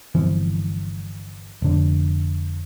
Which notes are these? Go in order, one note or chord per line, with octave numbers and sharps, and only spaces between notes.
G1 E3 F3 C4
F1 D3